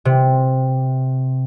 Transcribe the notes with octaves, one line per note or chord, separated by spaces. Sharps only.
C3